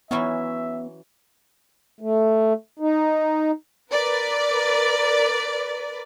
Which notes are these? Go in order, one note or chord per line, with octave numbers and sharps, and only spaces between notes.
E3 F#3 B3 C#4 E5
A3
D#4
A#4 B4 D5